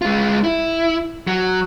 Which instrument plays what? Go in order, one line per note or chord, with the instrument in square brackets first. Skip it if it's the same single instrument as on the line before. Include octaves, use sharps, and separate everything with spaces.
[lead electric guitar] G#3 F4
E4
F#3